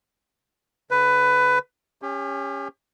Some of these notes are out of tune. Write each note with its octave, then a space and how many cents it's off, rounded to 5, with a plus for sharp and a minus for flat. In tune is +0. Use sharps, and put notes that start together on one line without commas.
D3 -45 B4 +15
C#4 +0 G4 +35